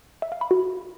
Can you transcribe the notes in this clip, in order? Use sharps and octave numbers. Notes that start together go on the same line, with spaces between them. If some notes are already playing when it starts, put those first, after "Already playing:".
E5
F5
B5
F#4